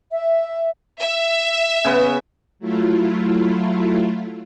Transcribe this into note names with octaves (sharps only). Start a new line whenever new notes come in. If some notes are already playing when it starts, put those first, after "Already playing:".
E5
E5
C#3 B3
F#3 A3 E4 F4